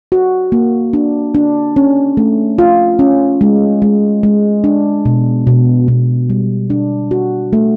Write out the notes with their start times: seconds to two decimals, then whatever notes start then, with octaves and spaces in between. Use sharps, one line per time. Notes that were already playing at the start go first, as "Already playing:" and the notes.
0.12 F#4
0.52 A#3
0.93 D4
1.35 D4
1.76 C#4
2.17 A3
2.59 F4
2.99 C#4
3.41 G#3
3.82 G#3
4.23 G#3
4.64 D4
5.05 B2
5.47 B2
5.88 B2
6.30 G3
6.70 D4
7.11 F#4
7.53 A3